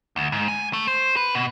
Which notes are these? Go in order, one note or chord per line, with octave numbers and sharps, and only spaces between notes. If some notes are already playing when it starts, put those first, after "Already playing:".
D2
G#2
G#5
A3
C5
B4
B2